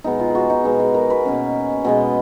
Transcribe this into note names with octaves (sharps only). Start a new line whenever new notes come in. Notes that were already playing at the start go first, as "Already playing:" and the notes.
B2 G#3 B3 D#4
F4
F#4 G#4
D#4
B2 G#3 B3 D#4
G#4
A#4
B4
B2 A#3 C#4
B2 G#3 B3 D#5